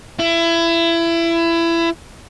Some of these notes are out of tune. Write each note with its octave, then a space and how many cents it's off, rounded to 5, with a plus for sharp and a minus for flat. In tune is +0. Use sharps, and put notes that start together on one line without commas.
E4 +25